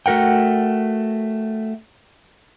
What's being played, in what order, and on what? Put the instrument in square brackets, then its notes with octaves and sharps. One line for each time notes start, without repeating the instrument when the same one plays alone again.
[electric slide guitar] A3 F#4 A#4 F#5 G5